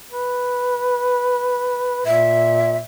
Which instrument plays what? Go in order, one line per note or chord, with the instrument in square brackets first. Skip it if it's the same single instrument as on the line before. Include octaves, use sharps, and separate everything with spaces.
[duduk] B4
[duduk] A#2 [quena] E5